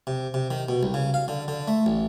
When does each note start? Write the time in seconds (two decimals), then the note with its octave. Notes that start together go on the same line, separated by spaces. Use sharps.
0.07 C3
0.34 C3
0.51 D#3
0.69 B2
0.83 C2
0.94 C#3
1.14 F5
1.28 D3
1.48 D3
1.68 A3
1.86 A1